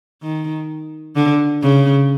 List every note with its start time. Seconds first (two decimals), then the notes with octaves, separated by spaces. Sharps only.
0.23 D#3
1.16 D3
1.62 C#3